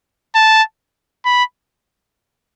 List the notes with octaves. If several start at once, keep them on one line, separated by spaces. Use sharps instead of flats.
A5
B5